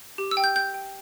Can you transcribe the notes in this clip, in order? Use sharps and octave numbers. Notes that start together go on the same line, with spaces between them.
G4
E6
G5
G6
G5 G6
G5